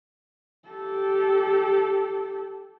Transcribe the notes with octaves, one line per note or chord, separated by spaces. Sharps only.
G4 A4